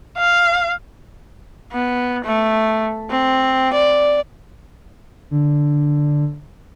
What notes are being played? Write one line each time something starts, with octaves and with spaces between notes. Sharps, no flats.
F5
B3
A3
C4
D5
D3